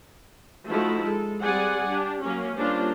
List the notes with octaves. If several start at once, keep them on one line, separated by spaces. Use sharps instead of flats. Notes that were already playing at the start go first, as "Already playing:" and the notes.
F3 A3 D#4 E4 F#4
G#3 A4
G3 C4 G#4 D5 F#5 G#5
D4 G4
F#3 A#3 C#4
G3 A#3 C#4 D4 F4 C5